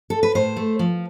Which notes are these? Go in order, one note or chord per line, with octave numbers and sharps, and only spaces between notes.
A4
B4
A2 C5
A3
F3